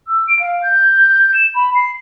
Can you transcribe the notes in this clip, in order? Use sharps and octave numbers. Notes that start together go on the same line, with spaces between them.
E6
D7
F5
G6
E7
B5
C7